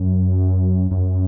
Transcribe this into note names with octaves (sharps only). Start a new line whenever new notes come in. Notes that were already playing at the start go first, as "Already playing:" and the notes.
Already playing: F#2
F#2